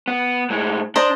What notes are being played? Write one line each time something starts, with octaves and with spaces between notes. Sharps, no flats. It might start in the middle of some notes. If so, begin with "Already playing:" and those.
B3
A2 G#3
D4 C5 D#5 A#5